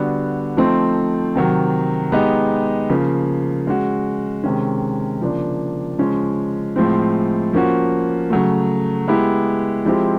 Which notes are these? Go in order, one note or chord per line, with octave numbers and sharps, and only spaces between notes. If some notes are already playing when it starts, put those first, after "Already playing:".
Already playing: D3 G3 B3 D4 F#4
F3 A3 C4 D#4
C3 D#3 F#3
G#3 B3 D#4 G4
C#3 F3 A#3
G#3 C#4 F#4
C3 D#3 G#3 C#4
C#3 F3 A#3 D4
C#3 F3 G#3 C#4
A2 F3 G#3 C4
F3 A#3 C#4 F#4
C#3 F#3 A3
G#3 B3 E4 G4
F3 G#3 C4 E4 G4